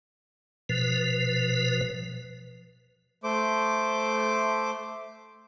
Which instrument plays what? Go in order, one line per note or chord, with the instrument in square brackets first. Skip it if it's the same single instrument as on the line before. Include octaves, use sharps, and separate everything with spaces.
[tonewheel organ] B2 F3 B4
[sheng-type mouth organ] A3 C5 D6